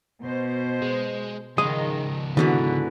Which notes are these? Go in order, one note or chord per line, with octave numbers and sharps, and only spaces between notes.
B2 C5
G#3
C#2 D#3 F3 G#3 D#6
G#2 B2 D3 D#3 E4 B4